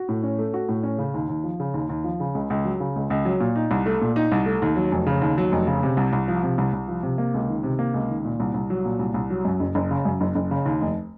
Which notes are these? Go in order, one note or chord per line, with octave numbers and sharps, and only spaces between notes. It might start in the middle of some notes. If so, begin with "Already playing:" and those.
Already playing: F#4
A2
C#4
A3
F#4
A2
C#4
C#3
D#2
D#2
F3
C#3
D#2
D#2
F3
C#3
C#2
C#2
F#3
C#3
C#2
C#2
F#3
A#2
D#4
C2
A3
A#2
D#4
C2
A3
D#2
F#3
F1
C#3
D#2
F#3
F1
C#3
C3
C2
C2
F3
C3
C2
C2
F3
C3
A#3
C#2
D#3
C3
A#3
C#2
D#3
A#2
C2
C2
F#3
A#2
C2
C2
F#3
F#2
F#1
F#1
C#3
F#2
F#1
F#1
C#3
D#2
F1